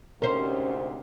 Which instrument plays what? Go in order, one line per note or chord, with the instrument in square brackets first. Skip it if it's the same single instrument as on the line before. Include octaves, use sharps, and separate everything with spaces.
[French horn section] D2 G#2 C3 [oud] C#4 C5 [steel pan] A#4